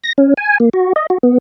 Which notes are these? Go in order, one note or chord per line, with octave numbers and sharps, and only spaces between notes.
A#6
C#4
G#5
A#3
F#4
D#5
F#4
B3